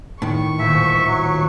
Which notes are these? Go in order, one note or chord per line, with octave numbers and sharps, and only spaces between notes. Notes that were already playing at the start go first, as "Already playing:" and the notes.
A2 D#3 C#6
D#1 A#2 C5 E5
F#3